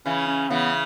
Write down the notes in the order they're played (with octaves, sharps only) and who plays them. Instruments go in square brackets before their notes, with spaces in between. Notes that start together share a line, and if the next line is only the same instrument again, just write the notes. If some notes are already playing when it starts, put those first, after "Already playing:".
[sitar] C#3 E3 [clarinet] C#4
[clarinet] C#4
[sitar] C#3 E3 [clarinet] B3